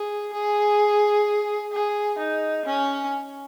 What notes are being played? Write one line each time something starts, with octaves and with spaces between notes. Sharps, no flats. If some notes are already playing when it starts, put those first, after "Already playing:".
Already playing: G#4
G#4
G#4
D#4
C#4